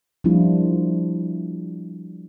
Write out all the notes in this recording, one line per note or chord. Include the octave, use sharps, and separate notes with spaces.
F3 G3 A#3 D4 E4 F4